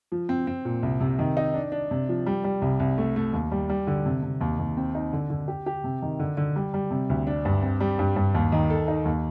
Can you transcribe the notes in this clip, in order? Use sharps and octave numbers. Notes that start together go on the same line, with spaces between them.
F3
C4
C4
A#2
C2
C3
D#3
D#4
D4
D4
C3
F3
G3
G3
C2
C2
A3
A3
D#2
G3
G3
D3
C3
C3
D#2
D#2
C4
D#4
D3
D3
G4
G4
C3
D#3
D3
D3
G3
G3
C3
D2
D4
G2
C4
G3
G2
G2
D#2
D#3
A4
D#4
D#2